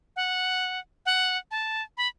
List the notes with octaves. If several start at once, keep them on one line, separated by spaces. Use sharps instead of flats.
F#5
F#5
A5
B5